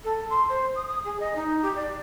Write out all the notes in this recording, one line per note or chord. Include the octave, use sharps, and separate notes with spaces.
A4
C6
C5
D#6
D#6
G#4
D#5
D#4
G4
D5